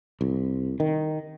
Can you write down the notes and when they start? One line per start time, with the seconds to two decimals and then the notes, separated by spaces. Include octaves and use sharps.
0.21 C2
0.80 D#3